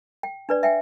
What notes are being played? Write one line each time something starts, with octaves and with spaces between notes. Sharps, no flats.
G5
D4 B4 D5
E5 G5 G#5